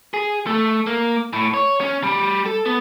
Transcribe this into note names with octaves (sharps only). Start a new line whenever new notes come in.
G#4
A3
A#3
A2
C#5
C#4
G3
A4
B3